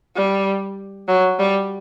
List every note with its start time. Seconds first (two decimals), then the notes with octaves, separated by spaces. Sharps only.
0.16 G3
1.08 F#3
1.39 G3